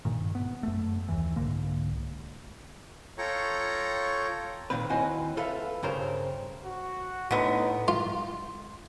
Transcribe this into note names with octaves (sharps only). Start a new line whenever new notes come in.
G2 A#2 D#3
B3
F#2 A3
D#2 E3
C2 G#2 D3 A#3
F4 A4 C#5 G5 A#5 C#6
A#2 D#3 C4 B4
D#2 C4 E4 F#4 D#5 G#5
F4 A4 B4 E5 F5
G2 C#3 A#4 C5
F#4
A2 D3 B3 D#4
F4